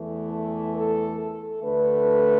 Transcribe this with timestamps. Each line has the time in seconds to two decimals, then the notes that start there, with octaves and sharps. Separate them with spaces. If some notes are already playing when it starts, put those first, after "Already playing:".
Already playing: E2 E3 A3
0.30 A4
0.75 A4
1.19 A4
1.62 D2 D3 A3 B4